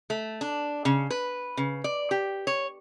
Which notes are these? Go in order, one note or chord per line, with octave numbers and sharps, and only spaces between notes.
A3
D4
C#3
B4
C#3
D5
G4
C#5